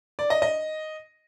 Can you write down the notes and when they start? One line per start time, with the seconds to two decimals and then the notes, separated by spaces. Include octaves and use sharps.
0.19 D5
0.30 D#5
0.42 D#5